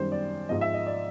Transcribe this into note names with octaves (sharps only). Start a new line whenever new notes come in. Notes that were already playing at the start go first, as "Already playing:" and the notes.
Already playing: F#2 D#3 G3 C5
D5
G#2 F3 D#5
E5
D#5
D5